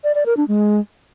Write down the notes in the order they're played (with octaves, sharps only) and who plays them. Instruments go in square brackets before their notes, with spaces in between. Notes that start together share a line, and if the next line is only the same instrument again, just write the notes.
[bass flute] D5
D5
A#4
D4
G#3